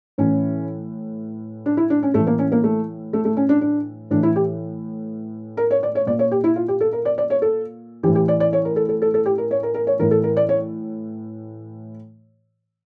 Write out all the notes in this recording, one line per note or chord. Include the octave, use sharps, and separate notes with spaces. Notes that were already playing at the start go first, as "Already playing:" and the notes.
A2 E3 C#4
D4
E4
D4
C#4
A2 E3 A3
A#3
C#4
A#3
A3
A3
A3
C#4
D4
D4
A2 E3 D4
E4
G4
A#4
C#5
D5
C#5
A#2 D5
C#5
G4
E4
F4
G4
A4
A#4
D5
D5
C#5
A4
A2 E3 G4
G4
D5
D5
C#5
A#4
A4
A4
A4
A4
G4
A#4
C#5
A#4
A#4
C#5
A2 E3 A#4
A4
A#4
D5
C#5